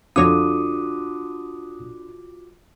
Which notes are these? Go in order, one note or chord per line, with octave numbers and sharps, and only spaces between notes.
F2 D3 F4 F#4 C#5 D6 D#6 A#6